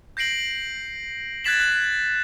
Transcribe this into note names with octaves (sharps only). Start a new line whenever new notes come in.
G6 A#6 C7 D7 F#7
F#6 G#6 A6 B6 E7 F#7
F#6